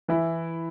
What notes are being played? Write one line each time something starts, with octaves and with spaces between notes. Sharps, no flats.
E3 E4